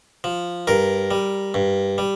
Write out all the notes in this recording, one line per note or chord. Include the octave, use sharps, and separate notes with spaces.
F3
G2 A#4
G3
G2
G3